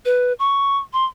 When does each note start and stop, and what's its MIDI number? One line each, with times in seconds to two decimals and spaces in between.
0.05 0.33 71
0.39 0.78 85
0.93 1.05 84